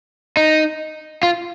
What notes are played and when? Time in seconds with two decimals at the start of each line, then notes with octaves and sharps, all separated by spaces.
0.37 D#4
1.23 F4